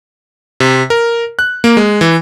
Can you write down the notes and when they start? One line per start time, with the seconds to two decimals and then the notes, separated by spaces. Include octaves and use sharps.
0.60 C3
0.90 A#4
1.39 F#6
1.64 A#3
1.77 G#3
2.01 E3